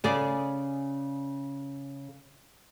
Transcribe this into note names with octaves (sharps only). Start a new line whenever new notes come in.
C#3 G#4 D5